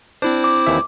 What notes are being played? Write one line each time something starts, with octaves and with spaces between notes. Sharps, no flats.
C4 D4 E4 C5
D6
D#2 E3 E5